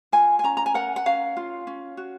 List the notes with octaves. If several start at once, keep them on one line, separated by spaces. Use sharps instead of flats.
F4 G#5
G#5
C#4 A#5
A#5
G#5
A#4 F#5
F#5
C#4 F5
F4
C#4
F#4